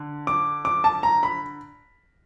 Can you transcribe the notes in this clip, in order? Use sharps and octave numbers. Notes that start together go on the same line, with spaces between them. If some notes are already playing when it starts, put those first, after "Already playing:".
Already playing: D3
D6
D6
A5
A#5
B5